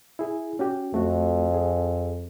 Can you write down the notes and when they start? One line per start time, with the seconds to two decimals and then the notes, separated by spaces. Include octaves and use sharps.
0.19 E4 G#4
0.59 C#4 F#4 G4
0.94 F2 A3 F#4
1.54 G#4